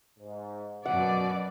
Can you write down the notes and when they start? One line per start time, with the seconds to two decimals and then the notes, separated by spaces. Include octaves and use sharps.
0.19 G#2
0.86 F#2 B2 D5 F#5